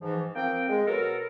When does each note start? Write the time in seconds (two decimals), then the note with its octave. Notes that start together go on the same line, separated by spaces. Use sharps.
0.02 G#2 E3 F3
0.36 F3 A#3 C4 G5
0.69 G#3
0.87 B2 F#3 A4 A#4